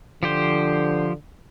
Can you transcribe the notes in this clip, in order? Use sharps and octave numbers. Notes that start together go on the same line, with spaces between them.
D3 F3 G4 C5